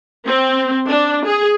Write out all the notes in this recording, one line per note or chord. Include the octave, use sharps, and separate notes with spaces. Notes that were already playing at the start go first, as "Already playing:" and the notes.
C4
D4
G#4